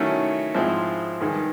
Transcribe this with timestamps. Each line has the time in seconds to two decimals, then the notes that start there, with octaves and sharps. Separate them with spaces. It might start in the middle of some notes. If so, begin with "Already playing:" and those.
Already playing: D#3 F#3 A3 C#4 E4
0.54 G#2 F3 G#3 C4 E4
1.21 G2 D#3 G#3